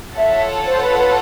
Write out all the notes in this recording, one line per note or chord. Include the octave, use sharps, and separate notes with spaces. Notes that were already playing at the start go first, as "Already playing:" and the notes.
F4 A4 C#5 E5 F#5 A5
C5
B4
B4